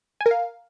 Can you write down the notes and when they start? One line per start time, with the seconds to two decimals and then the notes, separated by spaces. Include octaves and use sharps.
0.21 G#5
0.26 A#4
0.31 F5